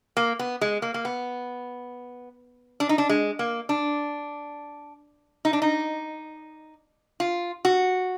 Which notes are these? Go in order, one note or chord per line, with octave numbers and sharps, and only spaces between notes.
A#3
B3
G#3
A#3
A#3
B3
D4
D#4
D4
G#3
A#3
D4
D#4
D4
D#4
F4
F#4